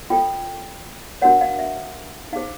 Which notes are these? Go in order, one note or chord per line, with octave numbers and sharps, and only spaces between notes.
F4 A4 C5 G5
D4 F#4 A#4 C#5 F#5
F5
E5
D#4 G#4 C5 F5